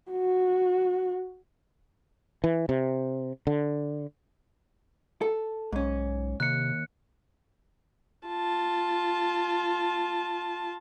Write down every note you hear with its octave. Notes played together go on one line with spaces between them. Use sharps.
F#4
E3
C3
D3
A4
B1 G#2 C#4
D#2 C3 F#6 C#7
F4 A5